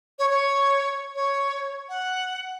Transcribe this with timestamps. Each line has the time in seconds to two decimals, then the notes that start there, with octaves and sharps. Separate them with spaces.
0.19 C#5
0.30 C#5
1.15 C#5
1.89 F#5